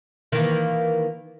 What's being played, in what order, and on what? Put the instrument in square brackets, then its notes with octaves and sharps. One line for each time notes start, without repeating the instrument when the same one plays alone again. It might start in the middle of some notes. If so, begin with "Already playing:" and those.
[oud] D#3 E3 A#3